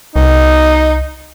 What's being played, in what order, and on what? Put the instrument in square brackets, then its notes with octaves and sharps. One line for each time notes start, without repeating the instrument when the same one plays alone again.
[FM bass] C2 [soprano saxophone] D#4